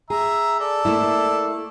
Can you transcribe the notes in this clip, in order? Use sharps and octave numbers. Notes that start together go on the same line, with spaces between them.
G#4 E5 A#5
A4 D5
A3 A#3 E4